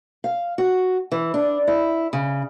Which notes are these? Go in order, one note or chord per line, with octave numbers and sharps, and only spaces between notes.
F5
F#4
E3
D4
E4
C#3